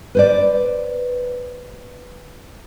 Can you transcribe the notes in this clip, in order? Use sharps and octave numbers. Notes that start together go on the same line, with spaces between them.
B4 C5 D5